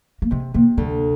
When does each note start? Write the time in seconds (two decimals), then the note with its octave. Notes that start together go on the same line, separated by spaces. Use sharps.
0.22 A#3
0.31 C3 G#3
0.54 C3 A#3
0.77 D2 G3